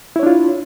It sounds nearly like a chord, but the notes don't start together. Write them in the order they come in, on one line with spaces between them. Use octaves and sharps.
E4 C#5 D4 F4